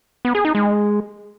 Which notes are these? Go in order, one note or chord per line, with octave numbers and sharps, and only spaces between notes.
B3
G#4
D#4
G#3